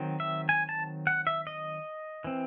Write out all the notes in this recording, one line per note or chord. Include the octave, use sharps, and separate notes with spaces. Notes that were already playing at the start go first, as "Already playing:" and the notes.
Already playing: D#3 F#3 C4
E5
G#5
A5
F#5
E5
D#5
E3 C4